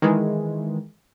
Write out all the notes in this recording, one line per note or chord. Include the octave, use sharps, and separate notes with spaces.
D#3 E3 G#3